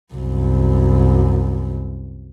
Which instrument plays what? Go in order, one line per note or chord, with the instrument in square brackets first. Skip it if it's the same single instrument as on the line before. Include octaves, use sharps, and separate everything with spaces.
[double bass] C2 F#2